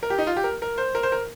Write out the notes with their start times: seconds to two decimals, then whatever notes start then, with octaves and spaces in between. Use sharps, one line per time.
0.03 A#4
0.10 G4
0.18 D#4
0.27 F4
0.37 G4
0.44 A#4
0.62 A#4
0.78 C5
0.95 A#4
1.03 C5
1.12 A#4